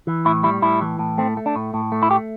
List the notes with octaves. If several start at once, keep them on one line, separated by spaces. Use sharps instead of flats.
E3
A2 E4
G3 E4
A2 E4
E3
A2
A3 C4
A3
D4
A2
A2
A3
E4
A3 G4